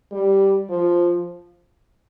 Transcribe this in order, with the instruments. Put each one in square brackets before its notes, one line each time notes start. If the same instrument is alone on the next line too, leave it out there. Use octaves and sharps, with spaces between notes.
[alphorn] G3
F3